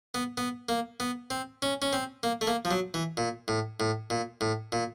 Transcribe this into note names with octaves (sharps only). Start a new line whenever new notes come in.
B3
B3
A#3
B3
C4
C#4
C#4
C4
A#3
A3
A#3
F3
F#3
E3
A#2
A2
A2
A#2
A2
A#2